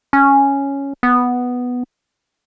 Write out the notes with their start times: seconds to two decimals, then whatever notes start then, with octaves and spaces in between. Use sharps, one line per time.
0.13 C#4
1.03 B3